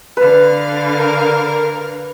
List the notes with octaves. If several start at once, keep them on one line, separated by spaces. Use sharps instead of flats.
D3 B4 F5 F6
A#4